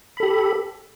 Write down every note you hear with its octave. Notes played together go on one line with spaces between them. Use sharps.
G4 A4 B5